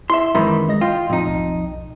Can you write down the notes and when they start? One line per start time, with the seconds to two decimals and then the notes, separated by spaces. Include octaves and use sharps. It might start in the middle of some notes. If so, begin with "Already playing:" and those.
0.10 E4 E5 C6
0.35 F#2 D#3 E3 G#3 A#4 B5
0.69 G#3 D#5 A#6
0.81 F4 G5
1.10 F2 A2 D#4 F4
1.27 B1